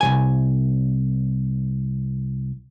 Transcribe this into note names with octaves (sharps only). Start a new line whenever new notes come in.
C2 C#3 G#5